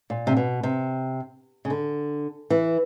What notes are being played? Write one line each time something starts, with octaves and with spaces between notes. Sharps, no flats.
A#2
C3
B2
C3
C#3
D3
E3